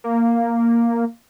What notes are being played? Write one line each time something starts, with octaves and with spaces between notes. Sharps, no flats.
A#3